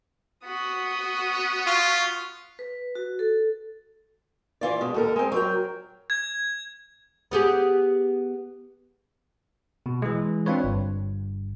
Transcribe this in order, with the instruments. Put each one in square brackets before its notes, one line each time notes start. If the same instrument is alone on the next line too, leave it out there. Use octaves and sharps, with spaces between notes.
[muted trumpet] B3 [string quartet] F#4 D#6
[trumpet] F4 [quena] C#6
[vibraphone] B4
F#4
A4
[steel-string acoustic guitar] E3 F4 D5
B2 G#3
D#2 A4 A#4
G#3 C4
F#3 A#4 G5
[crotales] G#6
[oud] B3 G4 G#4
[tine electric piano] B2
E3 G#3
C4 D4 F4 B4 C#5
G1 G2